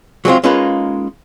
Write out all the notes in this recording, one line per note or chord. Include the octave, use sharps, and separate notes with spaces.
F#3 G#3 C4 F4
G#3 A#3 C#4 D#4 F4 B4